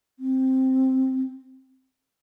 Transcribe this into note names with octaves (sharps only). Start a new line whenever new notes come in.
C4